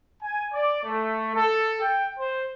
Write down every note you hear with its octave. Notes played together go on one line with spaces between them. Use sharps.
G#5
D5
A3
A4
G5
C5